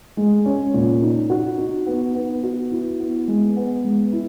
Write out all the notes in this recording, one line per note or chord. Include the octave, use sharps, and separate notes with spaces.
G#3
C#4
A#2
D#4
F#4
D#4
B3
B3
F#4
E4
B3
G#3
B3
G#3
E4